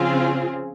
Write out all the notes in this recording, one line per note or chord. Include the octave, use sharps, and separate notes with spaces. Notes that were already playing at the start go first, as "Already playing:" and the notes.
Already playing: C#3 F3 C4 F4 G#4